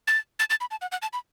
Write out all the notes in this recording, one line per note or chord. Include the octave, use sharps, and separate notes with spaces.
A6
A6
A6
B5
A5
F#5
F#5
A5
B5